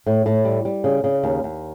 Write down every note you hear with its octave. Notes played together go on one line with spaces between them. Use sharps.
A2
A2
G3
G3
C#3
C#3
D#2
D#2